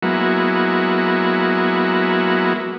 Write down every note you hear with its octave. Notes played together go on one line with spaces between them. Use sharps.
F#3 G#3 A#3 B3 E4 F#4